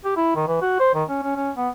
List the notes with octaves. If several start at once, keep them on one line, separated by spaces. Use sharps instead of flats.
G4
E4
D#3
E3
F#4
C5
D#3
C#4
C#4
C#4
B3